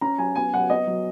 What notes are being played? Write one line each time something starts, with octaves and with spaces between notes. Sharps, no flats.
C#4 A#5
F#3 G#5
B3 G#5
F#3 F#5
B3 D#5
F#3